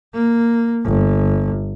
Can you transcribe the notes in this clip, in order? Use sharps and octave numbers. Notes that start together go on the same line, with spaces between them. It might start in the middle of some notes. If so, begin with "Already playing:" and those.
A#3
G1